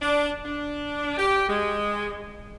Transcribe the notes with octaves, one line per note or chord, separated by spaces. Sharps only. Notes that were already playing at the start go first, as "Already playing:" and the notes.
D4
D4
G4
G#3